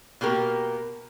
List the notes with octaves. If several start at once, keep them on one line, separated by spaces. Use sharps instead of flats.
B2 A#3 G4 A#4